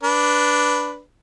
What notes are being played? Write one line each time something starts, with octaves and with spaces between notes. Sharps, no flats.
D4 B4